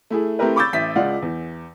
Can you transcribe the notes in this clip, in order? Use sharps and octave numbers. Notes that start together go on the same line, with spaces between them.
A3 E4 G#4
A3 C4 E4 G4 A#4 B4
B5 C#6 D6 E6 G6 A6
A1 E5 B6
C#2 G#3 F4 D5 F5 F#5
E2